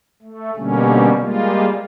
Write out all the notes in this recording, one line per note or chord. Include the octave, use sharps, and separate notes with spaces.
A3
B2 D3 G3 A#3 C#4
G3 G#3 A#3 F4